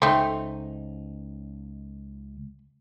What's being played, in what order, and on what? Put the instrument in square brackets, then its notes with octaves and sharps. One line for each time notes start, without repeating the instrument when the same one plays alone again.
[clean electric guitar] C#2 D#4 [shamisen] A3 C4